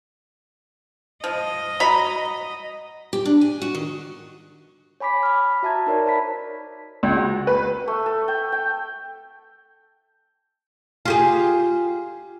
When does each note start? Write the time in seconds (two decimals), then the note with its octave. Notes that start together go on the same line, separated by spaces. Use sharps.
1.24 F3 D#5
1.80 F#4 A#5 B5
3.13 G4
3.26 D4
3.41 G#5
3.62 F#4
3.75 D#3
5.00 C#5 G#5 B5 D6 B6
5.23 B5 F6
5.63 F#4 E5 A5 A#5 G#6
5.87 D#4 A#4 C#5 D5
6.06 C5 A5 B5 B6
7.03 C#2
7.17 F#4
7.47 B4
7.87 A3
8.06 A4
8.28 G5
8.52 G5
11.05 F4 G4 G#4